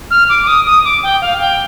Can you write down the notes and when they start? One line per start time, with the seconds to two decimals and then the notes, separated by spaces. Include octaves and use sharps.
0.10 F6
0.29 D6
0.43 D6
0.47 D#6
0.66 D#6
0.84 D6
1.03 G5
1.21 F5
1.40 G5